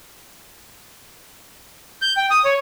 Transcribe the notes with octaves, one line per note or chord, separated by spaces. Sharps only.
G6
G5
D#6
C#5